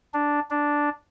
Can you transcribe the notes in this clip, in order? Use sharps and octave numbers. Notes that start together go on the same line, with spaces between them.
D4
D4